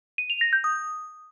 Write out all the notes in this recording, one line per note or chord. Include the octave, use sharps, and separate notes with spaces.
D#7
F7
A#6
G6
D#6